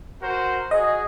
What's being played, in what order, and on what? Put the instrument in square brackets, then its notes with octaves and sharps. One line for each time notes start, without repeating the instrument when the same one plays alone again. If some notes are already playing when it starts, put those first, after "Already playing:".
[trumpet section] F#4 A#4 C5
[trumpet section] F#4 G#4 [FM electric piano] D#5